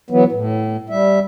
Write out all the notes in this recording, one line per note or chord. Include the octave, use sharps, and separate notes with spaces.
E3 F#3 B3
A2
G3 E5